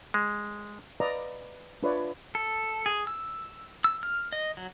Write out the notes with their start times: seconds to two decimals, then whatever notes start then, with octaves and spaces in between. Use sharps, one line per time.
0.14 G#3
1.00 B4 D5 D#5 F5 A#5
1.83 D4 F4 B4 C#5 D5 E5
2.35 A4
2.86 G#4
3.07 E6
3.84 E6
4.03 F6
4.32 D#5
4.57 F#3